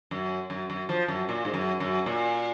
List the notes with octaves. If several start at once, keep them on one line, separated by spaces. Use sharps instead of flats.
F#2
F#2
F#2
F3
F#2
A#2
G#2
F#2
F#2
A#2